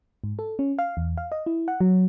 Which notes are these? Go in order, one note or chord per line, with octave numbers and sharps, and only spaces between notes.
G#2
A4
C#4
F5
E2
F5
D#5
E4
F#5
F#3